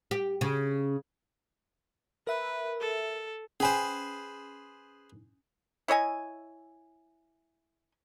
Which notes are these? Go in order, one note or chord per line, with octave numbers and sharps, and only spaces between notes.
G4
C#3
A#4 B4 E5
A4
C#4 G#4 B4 C5 G#5
E4 C#5 D#5 G#5